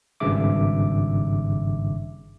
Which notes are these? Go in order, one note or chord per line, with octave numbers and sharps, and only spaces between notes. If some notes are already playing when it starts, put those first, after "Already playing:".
G#1 G2 C#3 E5 D6